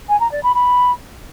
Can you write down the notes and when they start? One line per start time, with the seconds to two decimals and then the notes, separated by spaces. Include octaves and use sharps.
0.09 G#5
0.20 A#5
0.32 D5
0.43 B5
0.54 B5